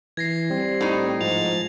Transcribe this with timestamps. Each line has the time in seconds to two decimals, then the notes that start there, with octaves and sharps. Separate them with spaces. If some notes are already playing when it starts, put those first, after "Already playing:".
0.17 E3 G#6 A#6 C7
0.50 G3 C4
0.81 A2 D#4
1.21 G#2 F3 A6 F7